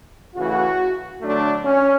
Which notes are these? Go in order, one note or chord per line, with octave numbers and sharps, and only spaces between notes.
C#3 E3 A3 F#4
D3 F#3 A3 D4
C#4